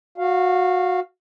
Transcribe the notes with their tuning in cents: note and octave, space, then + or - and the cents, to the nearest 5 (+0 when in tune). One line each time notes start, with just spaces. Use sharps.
F#4 -20 F5 +0